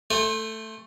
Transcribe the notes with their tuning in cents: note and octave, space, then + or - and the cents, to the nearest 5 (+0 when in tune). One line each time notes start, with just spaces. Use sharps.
A3 +10 C5 +30 G#5 -35